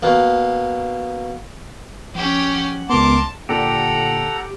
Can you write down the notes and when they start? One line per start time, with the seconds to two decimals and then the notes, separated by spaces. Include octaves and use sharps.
0.03 B2 A#3
2.15 F3 C#4 G4
2.55 F#5
2.90 C#2 B3 A#4 A5 C6 D6
3.49 A#2 D3 G4 A4 F#5 A#5